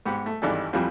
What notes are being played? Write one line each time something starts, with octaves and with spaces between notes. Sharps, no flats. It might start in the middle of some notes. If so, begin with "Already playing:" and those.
G#2 B3 G4
A3
G#1 G2 E3 D4 D#4 A4
F2 E3 F3 G3